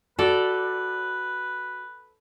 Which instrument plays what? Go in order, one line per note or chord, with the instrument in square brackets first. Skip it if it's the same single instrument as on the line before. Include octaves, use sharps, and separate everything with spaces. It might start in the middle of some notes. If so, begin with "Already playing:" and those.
[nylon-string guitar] F#4 [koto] A4 D5 [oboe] B4